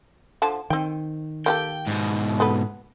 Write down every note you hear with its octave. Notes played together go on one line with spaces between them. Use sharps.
D3 F3 A5
D#3 C4 G5
A#3 G4 A4 G5
G#2 B2
B3 A4 B4